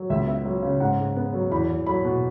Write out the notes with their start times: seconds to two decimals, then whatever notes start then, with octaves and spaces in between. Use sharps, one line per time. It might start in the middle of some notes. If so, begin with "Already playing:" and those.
Already playing: F#3
0.10 C#2 E5
0.27 B3 E5
0.45 F#3
0.62 C#3
0.80 G#2 F#5
0.99 G#2
1.16 B3
1.33 F#3
1.51 E2 B5
1.69 E2
1.86 F#3 B5
2.05 B2